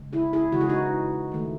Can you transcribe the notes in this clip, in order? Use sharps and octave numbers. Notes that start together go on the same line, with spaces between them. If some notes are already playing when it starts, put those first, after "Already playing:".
Already playing: C#3 G#3
E4 G#4
E4 G#4
C#3 E3 G#3 F#4
G#4
D#4 F#4
D#3 A3